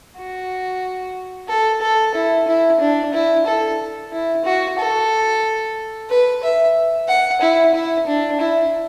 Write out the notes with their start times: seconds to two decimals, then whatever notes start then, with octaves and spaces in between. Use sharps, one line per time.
0.17 F#4
1.48 A4
1.81 A4
2.14 E4
2.47 E4
2.80 D4
3.13 E4
3.46 A4
4.12 E4
4.45 F#4
4.78 A4
6.09 B4
6.43 E5
7.08 F#5
7.41 E4
7.74 E4
8.07 D4
8.40 E4